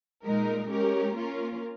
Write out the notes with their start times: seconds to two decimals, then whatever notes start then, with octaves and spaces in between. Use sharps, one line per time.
0.24 A#2 G#3 D#4 A#4
0.69 G#3 C#4 G4 A#4
1.15 A#3 C#4 F4 A#4